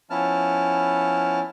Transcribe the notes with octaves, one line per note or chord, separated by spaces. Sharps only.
F3 B3 C#4 E4 A5 F6